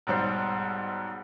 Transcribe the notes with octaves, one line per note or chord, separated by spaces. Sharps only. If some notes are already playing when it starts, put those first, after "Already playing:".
B1 G#2 G3 C5